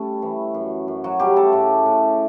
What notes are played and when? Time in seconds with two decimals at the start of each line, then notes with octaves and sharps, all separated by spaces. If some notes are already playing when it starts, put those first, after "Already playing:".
Already playing: G3 A3 C#4 A4
0.22 E3
0.54 F#2
0.88 F#2
1.04 F#3 F#4
1.20 C#3 G3 G4
1.36 A3 A4
1.53 A2
1.86 A2